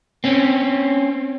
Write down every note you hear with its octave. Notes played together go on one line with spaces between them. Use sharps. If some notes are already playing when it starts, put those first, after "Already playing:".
C4 C#4